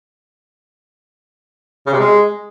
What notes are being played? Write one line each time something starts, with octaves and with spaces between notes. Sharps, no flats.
C#3
C3
G#3